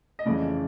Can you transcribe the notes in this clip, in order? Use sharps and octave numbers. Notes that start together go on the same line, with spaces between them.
D#5
F2 C#3 E3 A3 D5